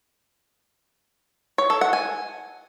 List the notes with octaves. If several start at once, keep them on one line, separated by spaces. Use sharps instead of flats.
C#5
A4
F#5
G#5